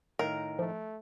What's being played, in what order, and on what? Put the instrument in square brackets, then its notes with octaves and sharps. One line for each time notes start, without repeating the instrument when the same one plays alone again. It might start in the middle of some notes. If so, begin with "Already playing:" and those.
[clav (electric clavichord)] A2 D#3 F5 [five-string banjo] A#4
[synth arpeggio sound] F3 [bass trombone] A3